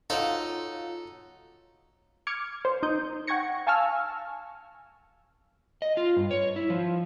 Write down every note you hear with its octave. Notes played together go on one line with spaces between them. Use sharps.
F#3 D#4 F4 A4 C#5 F#5
D6 F6 G#6 C#7
C5
D#4 D#6 G6
F#5 G5 C#6 G#6 A#6 C#7
F5 G#5 A5 C#6 E6 F6
D#5
F4
G2
C#5
E4
F3